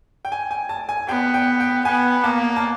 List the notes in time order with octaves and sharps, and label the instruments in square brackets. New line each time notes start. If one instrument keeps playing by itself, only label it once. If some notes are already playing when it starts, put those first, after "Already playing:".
[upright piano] G5
G#5
G#5
A5
G#5
[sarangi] B3 [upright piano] G5
[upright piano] G5
G5
[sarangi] B3 [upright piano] G#5
[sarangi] A#3 [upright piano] A5
[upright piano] A5